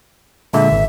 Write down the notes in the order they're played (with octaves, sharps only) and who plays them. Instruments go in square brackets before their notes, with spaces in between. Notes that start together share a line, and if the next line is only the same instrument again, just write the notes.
[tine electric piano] A#2 D3 G#3 [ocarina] E5
[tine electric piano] G#1